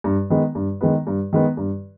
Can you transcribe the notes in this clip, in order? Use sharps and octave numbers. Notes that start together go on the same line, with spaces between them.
G2
D#3 G#3 B3
G2
D#3 G#3 B3
G2
D#3 G#3 B3
G2